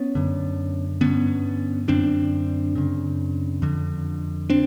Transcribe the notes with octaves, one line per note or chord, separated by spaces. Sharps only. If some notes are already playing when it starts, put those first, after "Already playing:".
Already playing: B3 C#4
F#2 D3
G2 D3 B3 C#4
F#2 D3 C4 D4
F#2 C#3
F2 D3
C4 D4